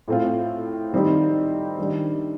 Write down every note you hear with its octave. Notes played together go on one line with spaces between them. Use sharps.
A2 A3 C4 F4
D#3 G3 C4 D#4 G4
D#3 G3 D4 G4